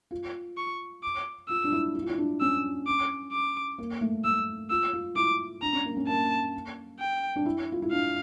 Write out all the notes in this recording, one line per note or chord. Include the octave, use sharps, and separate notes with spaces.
F4
C#6
D6
F4 E6
D4
E4
E4
F4
E4
D4
C#4 E6
D6
D6
A#3
A3
A3 E6
F4 E6
F4
E4 D6
D4 A#5
C#4
A#3
C#4
A#3 A5
G5
D4
E4
F4
E4
D4 F5